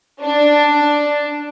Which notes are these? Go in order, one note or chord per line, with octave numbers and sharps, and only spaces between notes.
D4